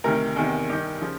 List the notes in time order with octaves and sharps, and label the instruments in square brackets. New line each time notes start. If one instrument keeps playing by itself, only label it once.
[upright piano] D2 C3 D#3 A#4
E2 C3 D#3
G2 D#3 G4
C#3 F3